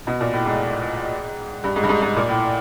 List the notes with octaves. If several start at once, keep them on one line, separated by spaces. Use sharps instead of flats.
B2
A#2
A2
G#2
G2
G#2
G2
G#2
G#2
A#2
A2